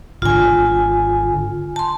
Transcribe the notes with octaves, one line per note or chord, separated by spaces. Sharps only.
G#1 D3 F4 G#5
A5 C6